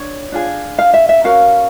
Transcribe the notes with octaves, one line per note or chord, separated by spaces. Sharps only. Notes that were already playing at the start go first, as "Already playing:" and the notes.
Already playing: D4 C#5
D4 F4 G#4
F5
E5
E5
C#4 F#4 A#4 F5